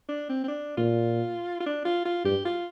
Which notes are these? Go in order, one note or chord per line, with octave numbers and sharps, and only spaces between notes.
D4
C4
C4
D4
A#2 F4
F4
D4
F4
F4
G2 G4
F4